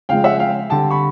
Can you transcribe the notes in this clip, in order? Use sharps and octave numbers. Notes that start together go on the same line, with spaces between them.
C#3 F3 G#3 F5 G5
E5 F#5
F5 G5
D3 G3 G5 A5
B5 C#6